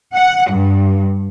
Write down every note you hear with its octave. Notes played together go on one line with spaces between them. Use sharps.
F#5
G2